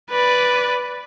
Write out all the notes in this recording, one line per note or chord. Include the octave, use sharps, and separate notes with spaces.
B4 D5